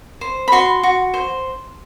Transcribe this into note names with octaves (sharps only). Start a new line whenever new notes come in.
C5
B5
F#4 C6
F#4
C5